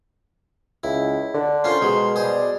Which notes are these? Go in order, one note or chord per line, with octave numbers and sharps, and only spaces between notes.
C#2 E4
D3
C#4 F4 A#4 C5 C6
B2 G#3
G3 G#4 C5